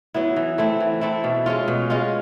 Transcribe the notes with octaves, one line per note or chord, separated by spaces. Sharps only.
F#3 B3 E4
E3
A3 C4 E4
E3
A3 C4 E4
B2
G#3 C#4 F4
B2
G#3 C#4 F4